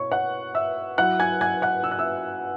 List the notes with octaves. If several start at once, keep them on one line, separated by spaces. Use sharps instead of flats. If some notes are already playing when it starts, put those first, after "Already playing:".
Already playing: B2 B3 E4 C#5 C#6
F#5 F#6
E5 E6
F#3 E4 F#5 F#6
G#5 G#6
G#5 G#6
F#5 F#6
E6
F#6
E5 E6